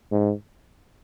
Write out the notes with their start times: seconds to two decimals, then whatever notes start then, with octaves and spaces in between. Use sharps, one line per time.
0.12 G#2